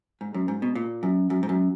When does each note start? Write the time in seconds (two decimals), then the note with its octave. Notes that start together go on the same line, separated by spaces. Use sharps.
0.21 G#2
0.34 F#2
0.48 G#2
0.62 B2
0.75 A#2
1.03 F#2
1.30 F#2
1.43 G#2
1.49 F#2